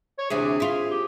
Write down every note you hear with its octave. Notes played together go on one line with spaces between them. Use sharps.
C#5
D2 C3 E3 G#4
E4 F4
G4